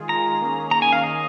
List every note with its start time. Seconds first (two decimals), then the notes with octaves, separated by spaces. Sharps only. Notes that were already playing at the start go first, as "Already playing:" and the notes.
Already playing: D#3 G#3 F4 G#4
0.09 A#5
0.41 D#3 A#3 C#4 G#4
0.71 A#5
0.82 G#5
0.93 F5
1.03 D#5